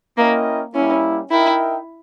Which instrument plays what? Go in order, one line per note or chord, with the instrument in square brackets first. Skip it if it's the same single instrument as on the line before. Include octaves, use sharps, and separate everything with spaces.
[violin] A#3 [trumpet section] C#4 E4 A#4 D#5 G5
[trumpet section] G3 A#3 E4 [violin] C#4
[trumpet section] D#4 A#4 E5 G5 [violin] E4